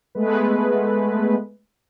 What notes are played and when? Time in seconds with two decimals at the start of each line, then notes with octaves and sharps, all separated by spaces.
0.15 G#3 A3 B3 B4